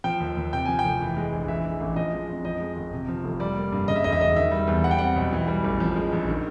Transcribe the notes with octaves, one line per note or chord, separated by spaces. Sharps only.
F3 G5
D#2
D#2
C3 G5
F3 G#5
G5
F1
E3
G#3
A#1
E3 E5
G#3
A1
F3 D#5
G#3
F2
F3 D#5
G#3
G#1
C3
F3
F1
G3 D5
A#3
G2
C#3 D#5
E5
E1 D#5
E5
E1 D#5
D#3 E5
G3
E2
G3 F#5
G5
C4 F#5
B1
E3
G3
A1
F3
G#3
A#1
D#3